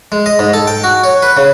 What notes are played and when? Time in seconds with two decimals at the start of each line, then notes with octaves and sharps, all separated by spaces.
0.12 G#3
0.26 D#5
0.39 G#2
0.54 A4
0.67 G5
0.84 F#4
1.04 C#5
1.22 B4
1.37 C#3